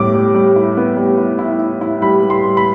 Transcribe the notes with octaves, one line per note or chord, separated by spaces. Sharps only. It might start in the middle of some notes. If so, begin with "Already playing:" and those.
Already playing: A2 G3 B3 D6
G3
G3
E4
B3
G3
E4
E4
E4
E4
G3 B5
G3
C6
G3
B5